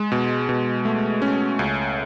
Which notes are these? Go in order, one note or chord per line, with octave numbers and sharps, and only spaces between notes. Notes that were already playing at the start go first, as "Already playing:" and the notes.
Already playing: G#3
B2
B2
A3
C#4
C#2